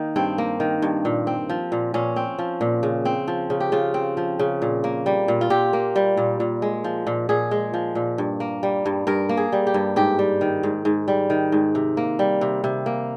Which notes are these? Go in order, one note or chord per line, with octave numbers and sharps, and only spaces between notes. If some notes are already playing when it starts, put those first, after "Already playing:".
Already playing: D#3 A#3 D#4
G2 C4
A#3
D#3
G2
A#2
C4
F3
A#2
A#2 C#4
C4
F3
A#2
C#3
C4
F3
C#3
G4
C#3 F4
C4
F3
C#3
A#2
A#3
G3
A#2
F4
A#2 G4
A#3
G3
A#2
A#2
G#3
F3
A#2
A#2 G#4
G#3
F3
A#2
G2
A#3
G3
G2
G2 A#4
A#3
G#4
G3
G4
G2
G#2 G4
G3
D#3
G#2
G#2
G3
D#3
G#2
C3
A#3
G3
C3
C3
A#3